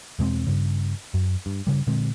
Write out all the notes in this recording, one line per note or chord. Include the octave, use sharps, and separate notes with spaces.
E2 B2 G#3 C4
G2 C#3
F#2
G2
G2 C#3 G3
A#2 D3 G#3 C4